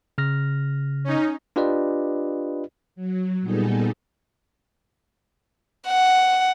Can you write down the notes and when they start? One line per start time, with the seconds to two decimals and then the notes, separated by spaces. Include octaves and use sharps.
0.18 C#3 F6 A#6
1.04 C#4 D#4
1.56 D4 F4 G4 B4 D5 D#5
2.96 F#3
3.41 A#2 G3 B3 D#4 G#4 A4
5.88 F#5